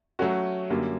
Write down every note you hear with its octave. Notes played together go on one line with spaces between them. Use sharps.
F#3 A3 C#4 F#4
F#2 D3 G3 A#3